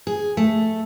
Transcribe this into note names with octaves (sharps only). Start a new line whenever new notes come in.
G#4
A3